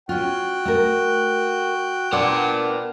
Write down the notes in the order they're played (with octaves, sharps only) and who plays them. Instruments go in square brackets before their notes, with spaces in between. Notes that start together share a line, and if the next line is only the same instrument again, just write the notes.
[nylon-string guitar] C#4 F4 [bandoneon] F#4 F#6 [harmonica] G5
[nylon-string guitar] A3 A#4
[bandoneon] B3 D4 [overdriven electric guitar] A#4 D5 [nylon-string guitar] F#5